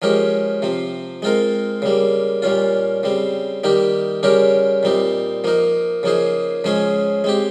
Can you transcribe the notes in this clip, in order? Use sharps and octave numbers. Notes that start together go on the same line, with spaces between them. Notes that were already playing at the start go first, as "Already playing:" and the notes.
F3 G#3 C#4 G4 A#4
C3 F3 C4
G#3 C4 F4 A#4
C#3 G3 A#3
A#2 G3 C#4 F4
C#3 G3 C4
D#3 G3 A#3 D#4 G4
C#3 G3 C#4 G4 A#4
A#2 G3 C4 D#4
F3 A#3 D#4 A#4
C#3 F3 A#3 D#4 G#4
C#3 F3 G#3 C#4 G#4
G#3 C4 G4